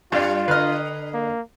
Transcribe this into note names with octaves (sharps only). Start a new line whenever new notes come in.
G2 G3 D4 F4
D3 B4 D#5 F6
A#3